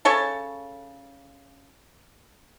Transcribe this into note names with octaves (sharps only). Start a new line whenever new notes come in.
C#3 A4 C#5 A5